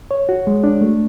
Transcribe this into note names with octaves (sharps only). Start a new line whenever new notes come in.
C#5
F#4
G#3
D4
A3